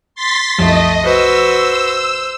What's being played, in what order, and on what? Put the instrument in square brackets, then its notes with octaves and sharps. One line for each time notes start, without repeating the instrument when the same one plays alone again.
[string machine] C6 A6 B6
[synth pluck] C2 F#2 F3 [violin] A3 [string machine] D#5
[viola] F#4 B4 [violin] C5 [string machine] E6